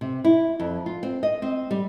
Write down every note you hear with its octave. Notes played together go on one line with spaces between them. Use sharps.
C3
E4
F2
F4
C4
D#5
C4
G3